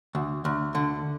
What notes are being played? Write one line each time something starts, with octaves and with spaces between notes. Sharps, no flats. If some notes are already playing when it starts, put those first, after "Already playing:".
D2
D2
D3